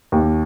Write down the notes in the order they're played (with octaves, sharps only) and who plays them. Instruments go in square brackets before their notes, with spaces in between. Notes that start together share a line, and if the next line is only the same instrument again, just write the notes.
[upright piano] D#2